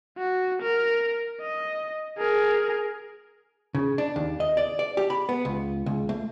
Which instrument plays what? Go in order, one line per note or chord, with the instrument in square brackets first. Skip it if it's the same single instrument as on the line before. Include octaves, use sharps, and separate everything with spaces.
[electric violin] F#4
A#4
D#5
G#4 A#4
[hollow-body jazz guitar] C#3
D4
D#2
D#5
D5
D5
G4
B5
B3
C#2
C#2
A3